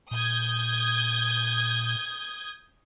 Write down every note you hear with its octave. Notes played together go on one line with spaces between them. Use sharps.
A#2 D#6 G6 G#6